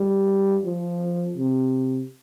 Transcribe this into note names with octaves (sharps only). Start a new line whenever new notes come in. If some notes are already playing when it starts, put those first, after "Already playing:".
Already playing: G3
F3
C3